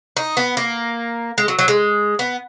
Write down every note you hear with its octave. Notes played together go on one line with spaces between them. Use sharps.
D#4
B3
A#3
G#3
F#3
F#3
G#3
B3